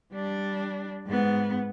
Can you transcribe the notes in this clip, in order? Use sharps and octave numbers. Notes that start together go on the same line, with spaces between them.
G3 D4
G#2 B3